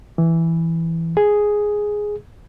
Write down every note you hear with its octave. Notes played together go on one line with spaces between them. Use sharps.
E3
G#4